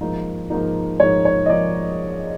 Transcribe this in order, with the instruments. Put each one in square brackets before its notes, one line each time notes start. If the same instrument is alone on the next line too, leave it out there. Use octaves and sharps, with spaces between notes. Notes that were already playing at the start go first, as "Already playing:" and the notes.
[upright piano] G#2 F3 A#3 D#4
G#2 F3 A#3 D#4
G#2 F3 A#3 D#4 C#5
C#5
D#5
F3 A#3 D#4 D5